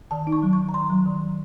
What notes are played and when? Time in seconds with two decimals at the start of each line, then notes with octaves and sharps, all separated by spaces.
0.11 D#3 A5
0.27 D#4
0.32 C#6
0.43 F#3
0.53 C#6
0.58 D#3
0.69 A#5
0.74 D#3 C6
0.90 F#3
1.06 D#3
1.22 F#3